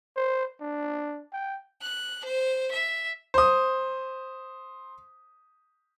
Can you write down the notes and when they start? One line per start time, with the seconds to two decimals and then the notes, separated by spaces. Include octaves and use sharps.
0.17 C5
0.61 D4
1.33 G5
1.82 F#6
2.25 C5
2.72 E5
3.34 C5 D#6